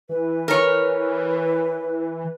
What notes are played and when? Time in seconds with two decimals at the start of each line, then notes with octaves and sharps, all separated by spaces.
0.09 E3 B4
0.48 A#4 C#5